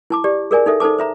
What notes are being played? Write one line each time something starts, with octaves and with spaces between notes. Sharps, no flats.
E4 A5 D6
G4 D5
G#4 A#4 D5 G#5
D#4 A4 E5
D#4 A4 C5 A5 D6
C5 E5 A#5